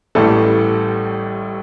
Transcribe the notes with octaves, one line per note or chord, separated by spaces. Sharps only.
A1 A2 E3 G3 A3 A4